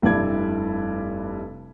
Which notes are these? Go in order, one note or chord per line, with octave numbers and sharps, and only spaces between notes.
F1 G2 E4 D5 G#6